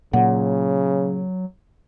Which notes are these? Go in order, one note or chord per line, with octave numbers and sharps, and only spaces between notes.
A#2 C#3 F#3 F#5